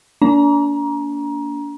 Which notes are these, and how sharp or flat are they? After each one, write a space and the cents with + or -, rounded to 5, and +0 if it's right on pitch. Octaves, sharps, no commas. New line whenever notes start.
A#3 +0 D4 -35 A#5 +25